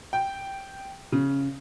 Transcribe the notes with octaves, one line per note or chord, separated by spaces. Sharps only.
G5
C#3